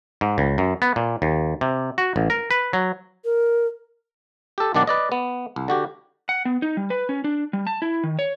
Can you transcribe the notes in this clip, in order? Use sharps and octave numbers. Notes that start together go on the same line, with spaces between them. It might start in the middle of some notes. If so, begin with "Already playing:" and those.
G#2
C#2
F#2
B3
A#2
D#2
C3
F#4
A1
A#4
B4
F#3
A#4
G4 A4
B1 D#3 D4 D5 F#5
B4 D5 D#5
B3
C2
D3 F#4 G4
F#5
B3
D#4
G3
B4
C#4
D4
G3
A5
E4
D#3
C#5